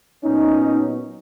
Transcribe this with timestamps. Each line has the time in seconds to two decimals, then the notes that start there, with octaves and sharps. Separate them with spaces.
0.24 A#2 F#3 B3 C#4 D#4